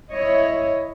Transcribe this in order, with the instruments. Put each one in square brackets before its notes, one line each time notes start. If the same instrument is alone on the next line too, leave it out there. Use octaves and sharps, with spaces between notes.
[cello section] E4 C#5 D#5